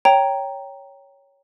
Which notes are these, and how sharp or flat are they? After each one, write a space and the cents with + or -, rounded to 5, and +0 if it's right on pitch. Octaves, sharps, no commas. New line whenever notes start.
C#5 +5 G5 +0 A#5 +0